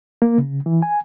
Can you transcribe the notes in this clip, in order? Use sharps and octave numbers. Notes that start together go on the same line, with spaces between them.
A#3
C#3
E3
G#5